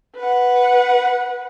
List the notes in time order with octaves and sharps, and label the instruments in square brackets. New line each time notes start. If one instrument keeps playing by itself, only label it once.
[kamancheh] B4 F#5